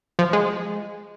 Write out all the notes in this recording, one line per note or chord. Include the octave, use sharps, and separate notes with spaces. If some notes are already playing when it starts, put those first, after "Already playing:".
F3
G#3